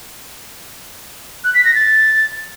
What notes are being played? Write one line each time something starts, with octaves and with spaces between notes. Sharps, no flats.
F#6
B6
A#6
A6